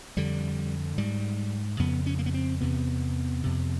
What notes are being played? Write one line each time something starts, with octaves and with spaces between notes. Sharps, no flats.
F2 D3 G3
G#2 G3
F2 C#3 B3
C#4
A#3
B3
C4
E2 C3 B3
F2 C3